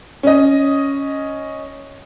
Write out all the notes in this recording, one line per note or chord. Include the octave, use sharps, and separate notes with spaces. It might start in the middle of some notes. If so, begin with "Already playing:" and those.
C#4 D#5